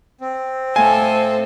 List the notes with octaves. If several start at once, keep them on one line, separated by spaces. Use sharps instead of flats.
C4
A2 A3 A4 C5 F5 G#5